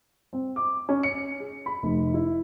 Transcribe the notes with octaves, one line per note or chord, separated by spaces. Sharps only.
C4
D6
C#4
C#7
G#4
B5
F1
E4